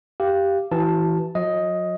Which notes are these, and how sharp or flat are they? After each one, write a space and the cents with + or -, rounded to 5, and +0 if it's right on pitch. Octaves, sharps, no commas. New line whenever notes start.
G4 +0 F5 -15
E3 +0 F#4 +40 A5 +0
F#3 -40 D#5 +10